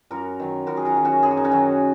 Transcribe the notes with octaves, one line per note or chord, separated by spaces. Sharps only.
F#2 F#4 A#4
D#3 F#3
F#2 F#4 A#4
G#4
F#4 A#4
D#3 F#3
C#4 F#4
F#2 G#4
F#4
D#4
C#4 F#4
D#3 F#3